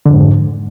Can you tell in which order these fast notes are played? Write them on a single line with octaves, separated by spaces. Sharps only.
D3 F2 G#2